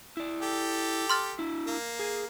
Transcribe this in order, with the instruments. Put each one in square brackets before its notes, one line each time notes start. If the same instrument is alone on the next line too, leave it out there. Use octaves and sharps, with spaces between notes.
[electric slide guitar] E4 D5
[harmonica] G4 A4
[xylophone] C6 F6 A6
[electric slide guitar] D4 E4
[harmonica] A#3
[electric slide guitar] G#4